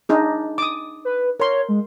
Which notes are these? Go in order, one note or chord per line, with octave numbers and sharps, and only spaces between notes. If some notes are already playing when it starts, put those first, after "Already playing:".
D4 D#4 G#4
D6 D#6
B4
A#4 C#5 C6
G#3